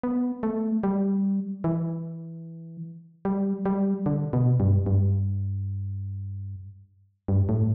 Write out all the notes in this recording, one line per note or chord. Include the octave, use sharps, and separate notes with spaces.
B3
A3
G3
E3
G3
G3
D3
B2
G2
G2
G2
A2